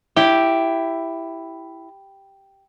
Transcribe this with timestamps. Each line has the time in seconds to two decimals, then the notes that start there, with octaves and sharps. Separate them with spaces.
0.16 E4 G4